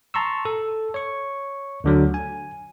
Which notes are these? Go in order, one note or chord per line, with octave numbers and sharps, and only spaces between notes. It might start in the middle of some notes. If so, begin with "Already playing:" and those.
A5 A#5 C6 C#6 E6
A4
C#5 C#6
D2 D3 F#3
G#5